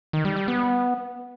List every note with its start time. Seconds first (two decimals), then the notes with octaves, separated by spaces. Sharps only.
0.13 D#3
0.25 G3
0.36 G3
0.48 B3